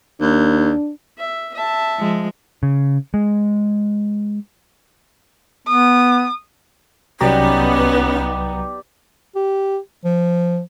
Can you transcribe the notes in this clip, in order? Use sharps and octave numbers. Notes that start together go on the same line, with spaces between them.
D#2 D4
E5
E5 A5
F3 G#3
C#3
G#3
B3 D#6
C2 F#3 B3 C#4 D#4 G4 D5 A#5
G4
F3